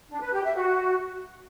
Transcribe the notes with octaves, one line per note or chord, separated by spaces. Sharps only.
D4
B4
G4
E5
F#4